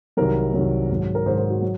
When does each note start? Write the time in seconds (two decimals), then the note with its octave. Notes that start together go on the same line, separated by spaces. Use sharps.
0.17 C2 C3 D#3 F#3 A#4
0.54 C2 C3 D#3 F#3
0.89 G#2 D#3 F#3
1.15 A#4
1.26 G#2 D#3 F#3 C5
1.38 A#4
1.50 F#4
1.62 F#3